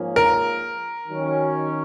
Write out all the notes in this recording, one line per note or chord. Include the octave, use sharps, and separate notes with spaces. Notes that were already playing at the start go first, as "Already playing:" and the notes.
Already playing: G#2 F3 A#3 C#4 G#4
A#4
D#3 F#3 C#4 F#4